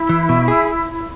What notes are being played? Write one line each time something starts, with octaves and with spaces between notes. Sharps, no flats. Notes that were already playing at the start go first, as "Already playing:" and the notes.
Already playing: E4
E3
B2
G#4